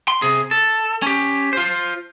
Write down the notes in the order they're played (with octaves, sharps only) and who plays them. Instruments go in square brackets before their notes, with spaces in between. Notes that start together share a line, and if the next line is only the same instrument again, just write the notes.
[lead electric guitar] C6
C3 G#4
A4
C#4 G4
F4 C5